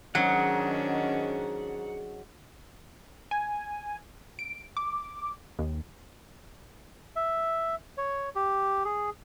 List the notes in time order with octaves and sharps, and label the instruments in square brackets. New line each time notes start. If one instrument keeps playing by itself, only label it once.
[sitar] G#2 [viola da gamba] D#3 C#4 D4 [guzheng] F#3 [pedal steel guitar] F#5
[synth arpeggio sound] G#5
D7
D6
D#2
[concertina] E5
C#5
G4
G#4